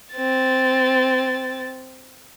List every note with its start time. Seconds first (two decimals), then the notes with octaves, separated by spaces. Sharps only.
0.15 C4 A6